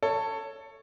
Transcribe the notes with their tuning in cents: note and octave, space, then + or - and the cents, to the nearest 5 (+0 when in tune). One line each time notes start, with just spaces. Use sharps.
A4 +20 C#5 +0